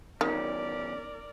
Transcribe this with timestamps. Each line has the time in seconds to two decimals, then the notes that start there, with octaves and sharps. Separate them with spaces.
0.21 E2 D#3 C#4 A#4 D5